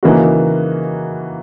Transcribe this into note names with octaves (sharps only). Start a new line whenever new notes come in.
C#3 E3 A#3 D#4 F#4